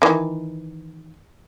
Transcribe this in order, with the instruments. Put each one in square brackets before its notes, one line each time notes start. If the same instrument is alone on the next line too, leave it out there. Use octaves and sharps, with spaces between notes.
[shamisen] D#3 E3